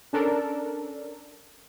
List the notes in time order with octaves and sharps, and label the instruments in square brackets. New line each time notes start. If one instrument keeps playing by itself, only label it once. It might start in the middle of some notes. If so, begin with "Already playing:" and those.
[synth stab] C#4 D4 A4 A#4